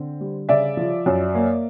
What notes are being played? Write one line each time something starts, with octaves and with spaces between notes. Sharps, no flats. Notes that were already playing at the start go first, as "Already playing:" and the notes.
Already playing: D3 C4
G3
C#3 D5 E5
F3
F#2
A#3